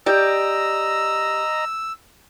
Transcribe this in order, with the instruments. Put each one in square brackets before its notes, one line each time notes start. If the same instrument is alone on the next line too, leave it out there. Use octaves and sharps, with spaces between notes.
[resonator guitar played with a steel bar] G4 D5 [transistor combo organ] D#5 A#5 [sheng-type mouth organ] E6